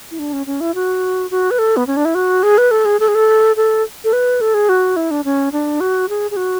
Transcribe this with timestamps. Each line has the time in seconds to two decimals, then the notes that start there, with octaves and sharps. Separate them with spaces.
0.11 E4
0.19 D4
0.33 C#4
0.47 C#4
0.61 E4
0.75 F#4
1.31 F#4
1.51 B4
1.59 A4
1.77 B3
1.87 C#4
1.97 D4
2.05 E4
2.15 F#4
2.43 G#4
2.58 B4
2.71 A4
2.85 G#4
3.00 A4
3.08 G#4
3.15 A4
3.56 A4
4.04 A4
4.13 B4
4.41 A4
4.54 G#4
4.69 F#4
4.96 E4
5.11 D4
5.24 C#4
5.52 D4
5.80 F#4
6.09 G#4
6.31 G#4
6.37 F#4